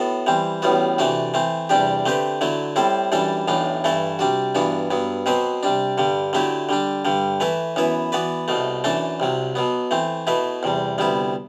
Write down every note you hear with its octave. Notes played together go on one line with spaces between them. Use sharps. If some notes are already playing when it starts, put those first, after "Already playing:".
Already playing: A2 B3 F#4 A4
E3 G3 C4
A1 A2 G3 B3 F#4
C3 E3 A3 D4 F#4
E3 A3 C4
E2 C3 G3 D4 G4
D3 A3 C4 G4 B4
D3 F#3 A3 E4
A2 G3 C4 E4 A4
F#2 E3 G3 D4 A4
B1 A2 E3 A3 D4
G2 E3 A3 E4 A4
C3 G3 D4 F#4
G2 E3 B3 D4 F#4
G2 F#3 B3
B2 F#3 C4 F#4 B4
C3 G3 D4
G2 D3 G3
D3 F#3 A3 E4 G4
D3 G3 D4
G2 D3 G3
E3 A3 E4 B4
F#2 E3 B3 E4 B4
E3 B3 F#4 B4 D5
C2 B2 A3
F#2 E3 A3 D4 A4
C2 C3 F#3
B2 F#3 B3
E3 A3 C4
B2 A3 E4 B4
E2 C3 G3
D2 C3 G3 B3 E4